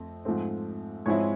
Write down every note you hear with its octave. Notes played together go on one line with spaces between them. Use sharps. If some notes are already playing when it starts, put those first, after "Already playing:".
Already playing: F2 A3 C4
G#2 F3 A3 C4
G#2 F3 G#3 C4 E4 C#5